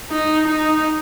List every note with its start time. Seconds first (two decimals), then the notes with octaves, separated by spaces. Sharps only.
0.10 D#4
0.47 D#4